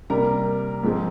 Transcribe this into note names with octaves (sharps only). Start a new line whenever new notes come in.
C3 G3 A#3 A#4 A#5
G#2 F3 G#3 C4